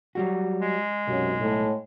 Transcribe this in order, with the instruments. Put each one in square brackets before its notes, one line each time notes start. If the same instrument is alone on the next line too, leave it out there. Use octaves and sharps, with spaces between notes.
[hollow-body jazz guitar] F#3 G3 F#4
[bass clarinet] G#3
[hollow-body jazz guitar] B1 [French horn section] F#2 C3 F#3
[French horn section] A2